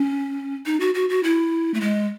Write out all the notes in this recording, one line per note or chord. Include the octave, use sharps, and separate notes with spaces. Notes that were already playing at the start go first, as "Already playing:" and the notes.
Already playing: C#4
D#4
F#4
F#4
F#4
E4
A3
G#3